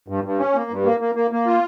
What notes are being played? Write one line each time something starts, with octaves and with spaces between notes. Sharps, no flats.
G2
G2
C#4
A#3
G2
A#3
A#3
A#3
A#3
F4